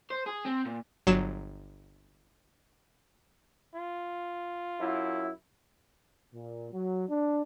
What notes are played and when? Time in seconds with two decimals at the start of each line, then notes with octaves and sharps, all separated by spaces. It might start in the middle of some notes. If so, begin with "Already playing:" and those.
0.11 C5
0.27 G#4
0.45 C4
0.65 A#2
1.07 G1 F#3 E7
3.75 F4
4.79 F#2 E4
6.34 A#2
6.73 F#3
7.10 D4